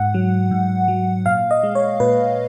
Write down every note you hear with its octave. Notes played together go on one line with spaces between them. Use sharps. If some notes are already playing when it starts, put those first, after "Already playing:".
Already playing: G#2 F#5
F#3
G#2
F#3
A#2 F5
D#5
G#3
C#5
A#2 B4